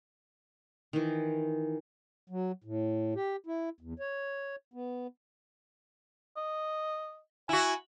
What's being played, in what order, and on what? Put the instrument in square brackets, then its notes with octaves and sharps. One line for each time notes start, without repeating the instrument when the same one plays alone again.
[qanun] D#3 E3
[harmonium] F#3
A2
G4
E4
E2
C#5
B3
[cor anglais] D#5
[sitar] E4 F#4 [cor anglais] G#5